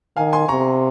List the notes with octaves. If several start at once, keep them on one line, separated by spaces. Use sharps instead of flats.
D#3 F5 G#5
G#5 C6
C3 A#5 C#6